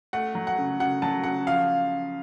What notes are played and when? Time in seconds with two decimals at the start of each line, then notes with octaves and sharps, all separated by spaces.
0.13 A3 F#5
0.35 F#3
0.47 F#5
0.58 C#3
0.80 C#3 F#5
1.02 F#3 A5
1.24 C#3 F#5
1.47 F3 F5